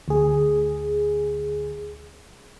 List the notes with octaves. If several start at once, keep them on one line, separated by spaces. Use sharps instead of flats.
D2 G#4